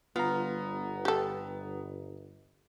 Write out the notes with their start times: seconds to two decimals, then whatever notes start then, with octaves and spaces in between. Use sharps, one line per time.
0.16 G1 B3 F4 A#5
1.05 G4 A4